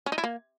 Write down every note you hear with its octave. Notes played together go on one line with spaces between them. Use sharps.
C#4
D#4
E4
A#3